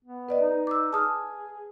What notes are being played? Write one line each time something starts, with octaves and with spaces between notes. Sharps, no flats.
B3
B4 D5 D#5
D#4
D6 E6
G#4 A5 D#6 F6